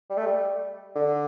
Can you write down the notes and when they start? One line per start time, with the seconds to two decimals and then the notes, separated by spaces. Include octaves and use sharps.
0.10 G3
0.17 A3
0.26 G3
0.95 D3